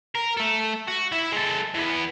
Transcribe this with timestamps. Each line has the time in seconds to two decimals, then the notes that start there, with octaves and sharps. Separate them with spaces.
0.15 A#4
0.37 A3 A4
0.88 F#4
1.12 E4 E5
1.32 G#3 A4
1.74 E3 B3